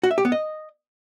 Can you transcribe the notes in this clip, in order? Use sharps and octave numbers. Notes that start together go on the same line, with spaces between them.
F#4
E5
G4
B3
D#5